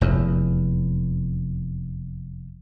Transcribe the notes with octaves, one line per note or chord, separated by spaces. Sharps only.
F1 E2